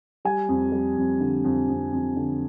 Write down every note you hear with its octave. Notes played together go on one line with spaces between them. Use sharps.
G3 G#5
F2
G3
F2
D3
F2
F2
F2
D3